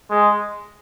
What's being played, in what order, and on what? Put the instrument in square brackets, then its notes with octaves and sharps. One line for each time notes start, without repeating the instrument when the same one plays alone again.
[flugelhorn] G#3